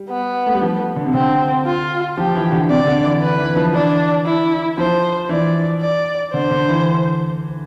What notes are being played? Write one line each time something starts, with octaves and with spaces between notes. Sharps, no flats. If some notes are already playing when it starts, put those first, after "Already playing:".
Already playing: G3
B3
A3
G3
F3
D3
C3
D3 C4
F4
F3 G4
E3
D3
C3 D5
D3
E3
B4
E3
F3
E3 D4
E4
F3 C5
E3 D5
D5
D3 C5
D3
E3